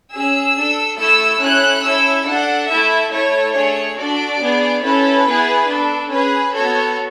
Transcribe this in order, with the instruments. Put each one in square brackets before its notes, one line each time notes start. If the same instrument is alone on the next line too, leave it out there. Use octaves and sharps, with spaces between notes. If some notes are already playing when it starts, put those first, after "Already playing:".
[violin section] C#4 G#4 E6
D4 A4
A3 E4 A4 E6
C#4 E4 A4 F#6
C#4 E4 A4 E6
D4 A4 F#5
A3 E4 A4 E5
A3 E4 A4 C#5
A3 D4 G#4 C#5
D4 F#4 A4 D5
B3 D4 G#4
C#4 E4 A4 B4
B3 E4 G#4
D4 A4
C#4 G#4 B4
B3 F#4 A4 C#5